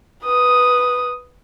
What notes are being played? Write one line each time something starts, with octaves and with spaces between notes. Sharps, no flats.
B4 D#6